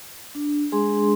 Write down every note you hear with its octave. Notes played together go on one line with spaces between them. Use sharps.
D4
G#3 D4 G#4 C6